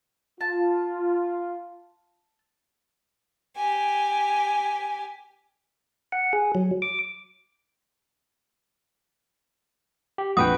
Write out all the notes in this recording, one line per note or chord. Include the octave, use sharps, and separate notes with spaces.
F4 A5
G4 G#5
F#5
G#4
F#3
D6
G4
A#1 F2 F#4 B4 G5 D#6